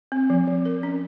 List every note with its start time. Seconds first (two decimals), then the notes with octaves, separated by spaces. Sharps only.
0.12 C4
0.30 F3
0.47 F3
0.65 A#4
0.83 C#4